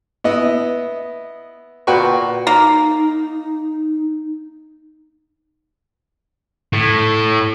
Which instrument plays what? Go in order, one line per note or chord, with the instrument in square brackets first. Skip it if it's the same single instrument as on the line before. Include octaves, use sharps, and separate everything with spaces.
[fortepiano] B3 E4 D#5
A#2 F#4 B4 G5 C#6
[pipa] A#3 [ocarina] D#4
[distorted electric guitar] A2